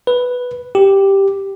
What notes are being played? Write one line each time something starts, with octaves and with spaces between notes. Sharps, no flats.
B4
G4